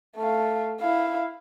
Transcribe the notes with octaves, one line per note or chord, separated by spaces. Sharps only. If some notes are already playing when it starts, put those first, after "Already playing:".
A3 F5
E4 F5